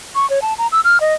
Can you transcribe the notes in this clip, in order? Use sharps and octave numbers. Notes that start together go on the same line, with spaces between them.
C#6
C#5
A5
A#5
E6
F6
D#5